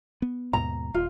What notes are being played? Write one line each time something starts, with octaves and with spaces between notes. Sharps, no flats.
B3
D#2 G#2 B2 A#5
D#1 F4